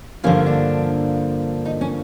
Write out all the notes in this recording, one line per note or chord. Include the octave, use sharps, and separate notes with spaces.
G2 D3 F3 A#3 C#4
D4
D#4
C#4